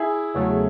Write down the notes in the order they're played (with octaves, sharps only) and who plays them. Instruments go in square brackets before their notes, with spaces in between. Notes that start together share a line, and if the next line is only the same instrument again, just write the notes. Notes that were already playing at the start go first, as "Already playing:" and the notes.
Already playing: [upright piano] E4 G#4
[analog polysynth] E2 C#3 F#3 A3